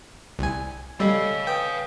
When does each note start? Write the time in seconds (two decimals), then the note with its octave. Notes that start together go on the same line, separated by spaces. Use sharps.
0.39 C2 G#5
1.00 G3 A4 C#5 D#5 F5 E6
1.47 B4 G5 D#6